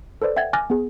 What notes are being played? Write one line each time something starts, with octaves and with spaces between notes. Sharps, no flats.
A4 B4 C5 D5
E5 F#5 G5 G#6 A6
G#5 D6 F6 F#6 A6 A#6
B3 G#4